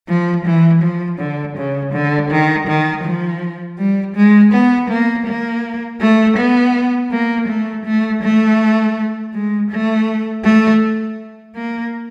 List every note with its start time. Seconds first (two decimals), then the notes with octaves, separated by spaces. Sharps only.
0.08 F3
0.45 E3
0.82 F3
1.19 D3
1.57 C#3
1.93 D3
2.30 D#3
2.67 D#3
3.04 F3
3.78 G3
4.16 G#3
4.53 B3
4.90 A#3
5.26 A#3
6.01 A3
6.37 B3
7.12 A#3
7.48 A3
7.85 A3
8.22 A3
9.34 G#3
9.71 A3
10.44 A3
11.56 A#3